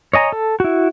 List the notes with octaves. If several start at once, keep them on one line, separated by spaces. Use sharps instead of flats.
C#5 D#5 G#5 A#5
A4
E4 F#4